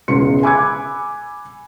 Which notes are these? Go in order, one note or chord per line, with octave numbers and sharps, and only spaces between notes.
E1 C#2 B3 C6 C#7
G#5 B5 D6 E6 F#6 G#6